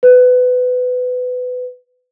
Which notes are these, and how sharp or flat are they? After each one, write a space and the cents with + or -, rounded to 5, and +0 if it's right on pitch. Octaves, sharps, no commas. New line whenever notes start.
B4 +20